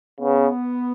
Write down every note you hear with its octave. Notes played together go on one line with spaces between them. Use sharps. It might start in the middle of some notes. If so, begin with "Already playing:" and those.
C#3 B3